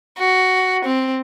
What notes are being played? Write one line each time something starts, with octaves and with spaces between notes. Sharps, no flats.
F#4
C4